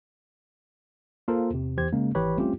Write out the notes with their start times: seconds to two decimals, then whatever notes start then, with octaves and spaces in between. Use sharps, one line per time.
1.28 A#3 F4 A4 A#4 C5
1.50 E2 C3
1.77 E2 E3 G4 C5 G#6
1.92 C#3 G#3 A#3 C#4
2.15 G#1 E3 G4 B4 C#5 B5
2.37 G3 A3 C4 C#4 F4 G4